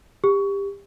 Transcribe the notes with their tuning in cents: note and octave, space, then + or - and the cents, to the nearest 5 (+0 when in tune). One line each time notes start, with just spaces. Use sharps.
G4 +20